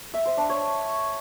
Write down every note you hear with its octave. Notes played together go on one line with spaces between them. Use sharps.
E5
C5
D4
C#5